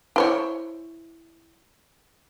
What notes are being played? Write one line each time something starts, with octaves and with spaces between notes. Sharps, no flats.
E4 C5 C#5